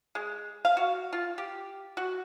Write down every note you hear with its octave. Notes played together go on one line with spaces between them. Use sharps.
G#3
F5
F#4
F4
G4
F#4